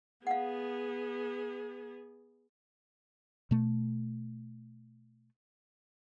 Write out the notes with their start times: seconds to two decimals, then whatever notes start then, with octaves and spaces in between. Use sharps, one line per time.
0.27 B3 G#4 F5 F#5
3.51 B2 A3